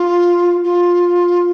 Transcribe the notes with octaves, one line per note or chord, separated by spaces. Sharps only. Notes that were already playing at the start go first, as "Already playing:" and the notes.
Already playing: F4
F4